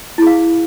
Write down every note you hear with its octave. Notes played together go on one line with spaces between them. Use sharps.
E4 G#4 F5